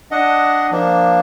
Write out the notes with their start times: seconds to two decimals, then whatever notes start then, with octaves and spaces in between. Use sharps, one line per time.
0.11 D4 D#5 F#5
0.72 F3 A#3 D4